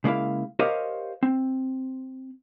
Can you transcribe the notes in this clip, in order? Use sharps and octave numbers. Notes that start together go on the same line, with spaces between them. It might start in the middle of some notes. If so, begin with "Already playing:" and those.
C#3 G#3 A#3 E4 F5
G4 A#4 C5 C#5 D#5 F5
C4